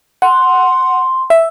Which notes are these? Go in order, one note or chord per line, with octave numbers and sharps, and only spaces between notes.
F#5 C6
E5